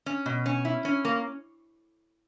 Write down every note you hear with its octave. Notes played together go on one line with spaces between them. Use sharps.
C#4
B2
C#4
E4
C#4
A#3